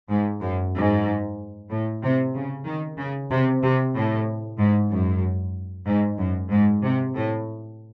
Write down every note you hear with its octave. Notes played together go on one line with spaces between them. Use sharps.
G#2
F#2
G#2
A2
C3
C#3
D#3
C#3
C3
C3
A2
G#2
F#2
G#2
F#2
G#2
C3
A2